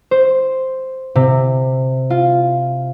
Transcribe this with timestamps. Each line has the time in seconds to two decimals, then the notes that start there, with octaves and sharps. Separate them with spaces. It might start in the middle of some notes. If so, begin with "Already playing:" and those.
0.11 C5
1.15 C3
2.10 F4